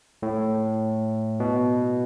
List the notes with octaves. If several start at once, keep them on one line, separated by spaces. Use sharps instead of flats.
A2
B2